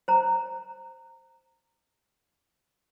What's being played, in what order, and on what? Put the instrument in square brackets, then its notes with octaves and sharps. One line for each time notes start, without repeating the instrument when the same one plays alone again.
[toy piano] C5 A#5